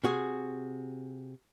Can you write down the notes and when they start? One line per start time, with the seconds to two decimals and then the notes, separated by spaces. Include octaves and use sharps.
0.04 C3 F#4 G#4